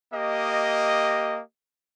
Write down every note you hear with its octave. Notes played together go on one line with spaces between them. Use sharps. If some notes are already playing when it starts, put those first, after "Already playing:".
A#3 G4 D#5